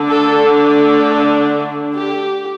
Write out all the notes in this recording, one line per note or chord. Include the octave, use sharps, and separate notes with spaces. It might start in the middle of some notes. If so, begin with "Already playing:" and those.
Already playing: D3 A3 D4
A4
A4
G4